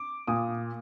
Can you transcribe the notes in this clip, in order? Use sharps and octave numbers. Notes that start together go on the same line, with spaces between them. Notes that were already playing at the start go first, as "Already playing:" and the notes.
Already playing: D6
A#2 D#6